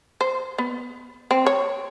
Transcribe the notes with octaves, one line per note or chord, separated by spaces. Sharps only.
C5
B3
C4
C#5